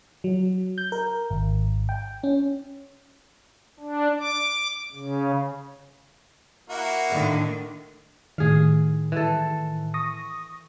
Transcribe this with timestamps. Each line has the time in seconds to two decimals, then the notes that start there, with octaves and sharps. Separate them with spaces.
0.24 F#3
0.78 G6
0.92 A#4
1.30 G#1
1.89 G5
2.23 C#4
3.80 D4
4.19 D6
4.93 C#3
6.70 A#3 E4 F#4
7.09 A2 D3 D#3
8.38 A2 D#3 G#4 F5
9.12 E3 A4
9.94 C#6 D#6 A#6